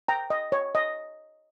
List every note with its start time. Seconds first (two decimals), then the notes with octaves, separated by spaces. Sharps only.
0.08 G5 A#5
0.30 D#5
0.52 C#5
0.75 D#5